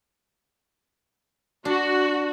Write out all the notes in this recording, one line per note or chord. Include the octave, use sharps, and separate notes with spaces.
D4 F#4